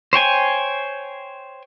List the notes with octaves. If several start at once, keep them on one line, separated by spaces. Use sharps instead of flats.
C5 C#5 G5 G#5